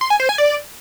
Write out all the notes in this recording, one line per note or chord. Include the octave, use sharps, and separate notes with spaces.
C6
G#5
C5
G#5
D5